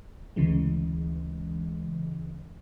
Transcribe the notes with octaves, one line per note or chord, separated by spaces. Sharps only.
D2 C#3 E3 G#3